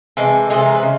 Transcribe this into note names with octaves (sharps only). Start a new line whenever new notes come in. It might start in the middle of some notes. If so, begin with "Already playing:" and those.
C3 E3 G#3 A4
C3 E3 G#3 G#4
A4
A#4
B4
C#3